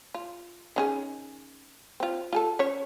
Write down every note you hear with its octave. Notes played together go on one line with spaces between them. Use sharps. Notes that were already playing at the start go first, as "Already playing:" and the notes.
F4
D#3 C#4 G#4
C4 F4
F4 G#4 A4
C#4 C#5